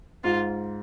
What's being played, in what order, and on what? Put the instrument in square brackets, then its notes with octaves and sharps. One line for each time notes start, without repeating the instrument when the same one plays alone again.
[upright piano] G#2 [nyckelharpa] F4